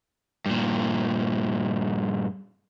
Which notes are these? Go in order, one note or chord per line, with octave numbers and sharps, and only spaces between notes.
G2 A#2